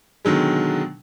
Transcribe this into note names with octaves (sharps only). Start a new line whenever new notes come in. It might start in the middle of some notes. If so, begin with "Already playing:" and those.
B2 D3 D#3 F#3 G#3